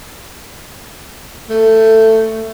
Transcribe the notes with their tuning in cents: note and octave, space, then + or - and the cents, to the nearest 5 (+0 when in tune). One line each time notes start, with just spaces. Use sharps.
A3 +15